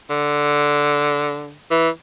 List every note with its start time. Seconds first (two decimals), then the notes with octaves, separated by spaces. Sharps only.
0.10 D3
1.71 E3